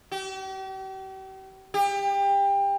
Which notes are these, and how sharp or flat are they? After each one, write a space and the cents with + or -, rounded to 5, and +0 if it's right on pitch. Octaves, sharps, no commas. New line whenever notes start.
G4 -40
G4 +25